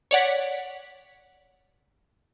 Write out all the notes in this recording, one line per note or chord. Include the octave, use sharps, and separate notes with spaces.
C#5 D5 F#5 B6